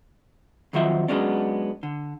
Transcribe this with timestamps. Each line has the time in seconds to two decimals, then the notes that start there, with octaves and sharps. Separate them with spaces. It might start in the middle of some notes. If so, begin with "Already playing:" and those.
0.73 F2 D#3 F#3 F4 E5
1.08 F#3 G#3 B3 C#4 D4
1.83 D3